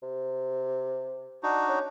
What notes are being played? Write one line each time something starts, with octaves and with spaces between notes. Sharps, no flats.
C3
D4 D#4 F#4
C#4